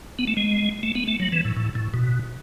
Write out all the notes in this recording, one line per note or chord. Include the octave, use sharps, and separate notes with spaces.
B3
A3
G#3
A3
B3
A3
F#3
E3
A2
A2
A2
B2